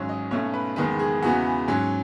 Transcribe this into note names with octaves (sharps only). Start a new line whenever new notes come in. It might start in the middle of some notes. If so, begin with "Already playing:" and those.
Already playing: G#1 G#2 F#3 C#4
D#5
B1 B2 A3 C#4 C#5
B4
F#1 E2 D#3 G#3 B3 B4
G#4
E2 C#3 E3 B3 F#4
G#2 F#3 C#4